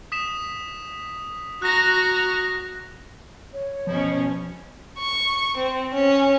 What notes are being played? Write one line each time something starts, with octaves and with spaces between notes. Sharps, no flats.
D#6 B6 E7
F#4 A#5 F#6 A#6
C#5
B2 F3 C#4
C#6
C4
C#4